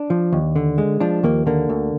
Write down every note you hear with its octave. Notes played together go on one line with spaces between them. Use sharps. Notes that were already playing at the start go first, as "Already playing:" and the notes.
Already playing: D4
F3
D#2
D3
G#3
F3 D4
D#2 A#3
D3 A#3
D2